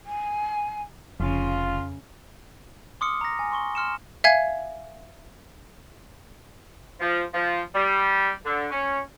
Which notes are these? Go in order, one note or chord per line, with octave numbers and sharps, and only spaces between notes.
G#5
F1 F2 C#3 F4
C6 D6 D#6 F6 C#7
A#5 A#6
G#5
C6 C#6 G7
C6 F6 C#7 E7
E5 F5 G#5 G#6
F3
F3
G3
D3
C#4